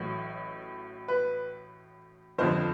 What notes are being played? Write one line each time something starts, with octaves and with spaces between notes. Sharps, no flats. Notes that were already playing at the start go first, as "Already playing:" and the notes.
Already playing: A1 A2 F#3
B4
G1 F2 D3 F3 C5